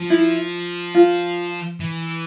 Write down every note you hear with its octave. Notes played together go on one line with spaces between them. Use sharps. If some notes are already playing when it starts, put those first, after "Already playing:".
Already playing: F3
E4
F4
E3